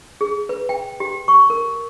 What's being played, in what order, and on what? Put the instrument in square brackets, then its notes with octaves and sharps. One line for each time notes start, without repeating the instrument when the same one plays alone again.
[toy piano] G#4
B4
G5
G4
C#6
A#4